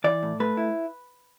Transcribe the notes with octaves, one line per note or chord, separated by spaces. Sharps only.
E3 D5
A2
A3 B4
E4